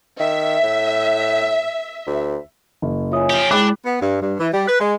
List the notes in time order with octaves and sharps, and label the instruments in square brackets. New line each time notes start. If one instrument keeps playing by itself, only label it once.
[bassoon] D#3 [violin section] E5
[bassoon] A2
D2
[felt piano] F#1
[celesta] F4 E5 D#6 [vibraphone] C#5 G#5
[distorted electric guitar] F3 G4
[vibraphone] G#3 E4 [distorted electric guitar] D4 [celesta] G#4 G5 [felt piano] B5 D6 F#6
[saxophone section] B3
G2
G2
E3
G3
B4
G#3